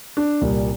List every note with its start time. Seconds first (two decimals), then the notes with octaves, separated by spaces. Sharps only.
0.17 D4
0.41 C2 A#2 G3 A#3